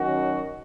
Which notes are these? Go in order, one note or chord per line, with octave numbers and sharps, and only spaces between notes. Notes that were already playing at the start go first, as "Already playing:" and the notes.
Already playing: D#3 F#3 C#4 F#4